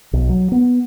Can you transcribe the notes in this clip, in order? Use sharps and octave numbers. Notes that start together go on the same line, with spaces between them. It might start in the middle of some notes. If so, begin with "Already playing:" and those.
B1
F#3
B3